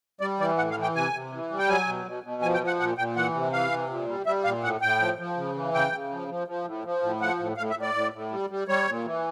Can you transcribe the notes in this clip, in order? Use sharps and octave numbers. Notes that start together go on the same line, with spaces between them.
G3 D5
E3 D5
A2 F#5
F5
E3
G5
C3 G#5
C3
E3
G3
G5
F#3 G#5
B2
B2
B2
F3 G#5
G5
F3
F#5
A#2 F#5
A#2 G5
E3 F#5
C3
E3 F5
C3
A#2
G3
G3 E5
A#2 F5
A2 F#5
A2 G5
F3
F3
C#3
E3
C#3 G5
C#3
F3
F3
F3
A2
F3
A2
F3 F#5
A2
A2 F5
E5
A2
D5
A2
A2
G3
G3
G3 C#5
A#2
E3